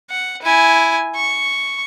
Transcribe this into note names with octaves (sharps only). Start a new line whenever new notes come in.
F#5
E4 G#5
C#6